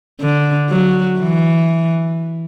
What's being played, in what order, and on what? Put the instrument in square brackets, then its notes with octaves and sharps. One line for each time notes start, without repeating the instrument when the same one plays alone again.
[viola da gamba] D3
F#3
E3